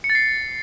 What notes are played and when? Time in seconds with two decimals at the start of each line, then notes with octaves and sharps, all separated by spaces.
0.04 C#7
0.10 A6
0.15 C7